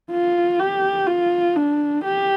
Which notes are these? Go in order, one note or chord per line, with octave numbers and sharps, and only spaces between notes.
F4
G4
F4
D4
G4